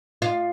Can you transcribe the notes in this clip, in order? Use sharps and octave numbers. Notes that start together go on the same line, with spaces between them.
F4